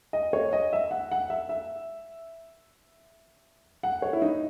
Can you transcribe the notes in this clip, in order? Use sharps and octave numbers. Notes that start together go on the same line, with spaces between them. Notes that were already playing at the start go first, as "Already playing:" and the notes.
D#5
C#5
D#5
E5
F#5
F#5
E5
E5
F#5
C#5
E4
D#4